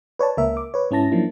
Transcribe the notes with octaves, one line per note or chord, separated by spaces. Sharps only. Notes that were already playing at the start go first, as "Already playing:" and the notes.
B4 C#5 D5 A5
C#2 A#3 A#4 E5
D6
B4 C#5
G#2 C#4 E4 A5 A#6
F3 F#3 A#3 D4 E4